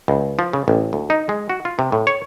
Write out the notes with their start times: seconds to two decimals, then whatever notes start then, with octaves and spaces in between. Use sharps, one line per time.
0.08 C#2
0.39 F3
0.53 C#3
0.68 A1
0.93 D2
1.10 D#4
1.29 G#3
1.50 F#4
1.65 F4
1.79 C3
1.92 A2
2.07 C#5